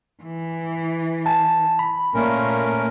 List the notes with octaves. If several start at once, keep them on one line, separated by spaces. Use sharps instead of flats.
E3
G#5 A5
B5
A#2 A3 C#4 A#4